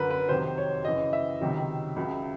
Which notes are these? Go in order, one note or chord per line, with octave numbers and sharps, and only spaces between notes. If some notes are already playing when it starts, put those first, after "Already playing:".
Already playing: F#2 D3 F#3 A#4 B4
B4
F2 C3 D#3 F#3 C5
C#5
F#2 C#3 E3 D#5
E5
C#2 C3 D#3 F#3
C#2 C#3 F#3